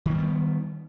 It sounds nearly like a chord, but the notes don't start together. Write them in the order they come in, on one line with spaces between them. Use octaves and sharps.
D#3 A#3 G3 B3